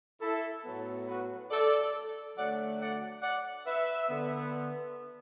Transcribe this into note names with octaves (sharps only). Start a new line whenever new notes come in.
E4 A4
A2 F#3 B3
F#4 B4
A4 D5
D3 F#3 A3 D5 F#5
D5 F#5
D5 F#5
B4 E5
D3 B3